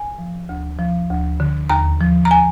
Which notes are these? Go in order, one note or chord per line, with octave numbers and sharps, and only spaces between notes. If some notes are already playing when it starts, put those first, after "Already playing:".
Already playing: G#5
F3
D2
F3
D2
D3
D#2 A#5
F3
A#5
G#5